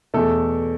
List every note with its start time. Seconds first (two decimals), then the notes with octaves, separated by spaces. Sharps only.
0.14 E2 B2 A3 A4